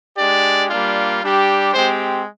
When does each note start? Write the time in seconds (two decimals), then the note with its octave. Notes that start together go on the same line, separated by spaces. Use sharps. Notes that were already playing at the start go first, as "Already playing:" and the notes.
0.18 G#3 D4 G4 D5
0.70 G3 A#3 D4 F4
1.22 G3 D4 G4
1.74 G#3 C4 G4 C5